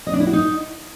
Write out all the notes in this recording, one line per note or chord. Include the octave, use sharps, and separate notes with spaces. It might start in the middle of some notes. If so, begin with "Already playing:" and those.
D#5
D4
E4
F#4
D#4